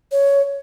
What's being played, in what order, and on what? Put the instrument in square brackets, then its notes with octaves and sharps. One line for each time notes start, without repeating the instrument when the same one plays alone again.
[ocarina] C#5